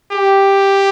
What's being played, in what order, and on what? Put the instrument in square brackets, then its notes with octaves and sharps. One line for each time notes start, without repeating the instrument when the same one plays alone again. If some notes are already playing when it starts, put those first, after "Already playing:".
[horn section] G4